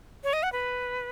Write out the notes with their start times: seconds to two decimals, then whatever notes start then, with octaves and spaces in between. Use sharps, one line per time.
0.24 C#5
0.33 D#5
0.43 F#5
0.52 B4